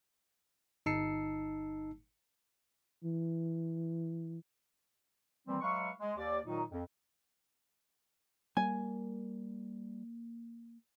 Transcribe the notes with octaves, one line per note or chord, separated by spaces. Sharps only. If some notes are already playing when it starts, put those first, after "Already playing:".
G1 D#4 A5 E6 C7 C#7
E3
D#3 E3 G3 A#3 C4
F#3 G#3 B4 E5 F5 C#6
G#3
D#2 D5
A#2 D#3 F#3 D#4
F2
G3 A#3 G#5